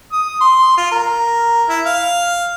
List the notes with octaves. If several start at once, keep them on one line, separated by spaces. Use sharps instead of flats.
D#6
C6
F4
A#4
E4
F5